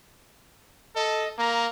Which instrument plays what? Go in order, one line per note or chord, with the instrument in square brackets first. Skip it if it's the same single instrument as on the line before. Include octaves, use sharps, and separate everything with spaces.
[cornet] A4 [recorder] D#5
[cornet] A#3 [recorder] A#5